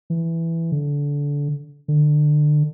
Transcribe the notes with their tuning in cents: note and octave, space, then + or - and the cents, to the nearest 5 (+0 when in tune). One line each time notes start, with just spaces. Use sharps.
E3 +5
D3 -25
D3 +25